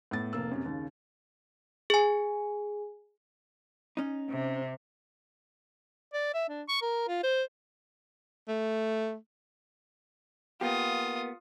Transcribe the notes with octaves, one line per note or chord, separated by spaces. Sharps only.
A2 B3 A6
F1 A#3 E6
F#2 C3
D#2 C#3
G#4 G#5
C#4 D#4
C3
D5
E5
D4
C#6
A#4
F4
C5
A3
A#3 B3 F4 G4 D#6